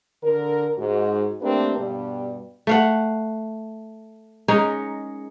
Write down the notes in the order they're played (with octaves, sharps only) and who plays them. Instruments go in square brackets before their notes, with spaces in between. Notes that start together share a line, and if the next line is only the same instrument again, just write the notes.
[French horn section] D3 A#4
G#2 F#4
A3 A#3 C4 D4 G4 B4
G2 B2 G3
[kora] A3 F5 F#5
G#3 C#4 D#4 A#4